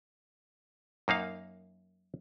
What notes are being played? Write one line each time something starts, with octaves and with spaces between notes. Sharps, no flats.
F#2 A#3 D#4 F5